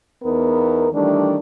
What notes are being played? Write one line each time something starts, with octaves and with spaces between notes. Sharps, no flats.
E2 B3 D#4 A#4
D#3 E3 G3 A3 D4